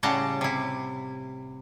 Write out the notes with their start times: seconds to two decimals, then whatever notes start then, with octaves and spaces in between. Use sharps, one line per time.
0.03 A2 C#3 G3 F#5 A5 A#5
0.41 C3 E4